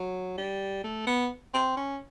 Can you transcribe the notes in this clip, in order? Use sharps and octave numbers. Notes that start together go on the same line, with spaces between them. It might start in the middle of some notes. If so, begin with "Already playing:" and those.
Already playing: F#3
G3
A3
B3
C4
C#4